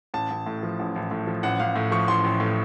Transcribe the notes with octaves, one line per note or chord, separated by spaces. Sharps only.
A1 A5
A1
A2
F3
A1
A1
A2
F3
A1 F#5
A1 F5
A2
F3 C#6
A1 C6
A1
A2